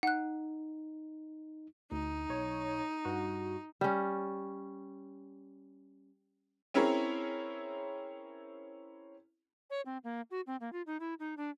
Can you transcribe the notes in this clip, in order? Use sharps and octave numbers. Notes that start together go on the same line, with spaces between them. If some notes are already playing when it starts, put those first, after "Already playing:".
D#4 F#5 F#6
D2 D#4
B1 C#5
G2 F#4
G3 C#4
C4 C#4 E4 G#4 A#4 C#5
C#5
C4
A#3
F#4
C4
A#3
F4
D#4
E4
D#4
D4